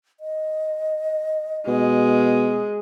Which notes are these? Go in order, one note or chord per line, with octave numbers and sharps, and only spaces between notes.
D#5
B2 G#3